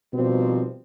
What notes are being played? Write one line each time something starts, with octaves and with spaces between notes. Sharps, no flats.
B2 D#3 F3 G3 C4